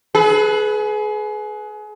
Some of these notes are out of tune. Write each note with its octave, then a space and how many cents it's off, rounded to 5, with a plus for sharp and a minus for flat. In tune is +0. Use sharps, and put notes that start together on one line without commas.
G#4 +30 B4 +0